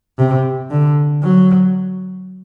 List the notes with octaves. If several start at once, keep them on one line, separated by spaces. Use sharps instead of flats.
C3
D3
F#3